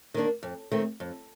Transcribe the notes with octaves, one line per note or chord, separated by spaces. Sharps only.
D#3 A#3 D4
F2
D#3 A3 C4
F2